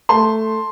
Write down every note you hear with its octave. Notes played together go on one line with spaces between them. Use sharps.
A3 A5 C6